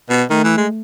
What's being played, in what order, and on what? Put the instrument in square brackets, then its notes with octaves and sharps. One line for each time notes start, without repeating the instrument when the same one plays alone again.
[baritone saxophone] B2
[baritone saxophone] D#3 [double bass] A3
[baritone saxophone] E3
G#3